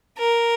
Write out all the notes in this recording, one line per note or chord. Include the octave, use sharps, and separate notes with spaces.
A#4